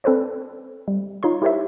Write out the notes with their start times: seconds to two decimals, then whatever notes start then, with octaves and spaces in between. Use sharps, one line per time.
0.04 C4 A4 B4 C5 D5
0.88 G3
1.23 D#4 F4 C#5 C6
1.42 E4 G4 A#4 C5 C#5 E5